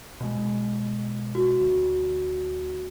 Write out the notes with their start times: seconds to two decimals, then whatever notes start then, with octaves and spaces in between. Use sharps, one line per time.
0.21 B2 G#3
1.35 F#4
1.60 D2